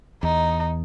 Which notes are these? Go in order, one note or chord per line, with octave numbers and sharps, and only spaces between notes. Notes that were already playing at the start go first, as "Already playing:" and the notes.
E2 D#4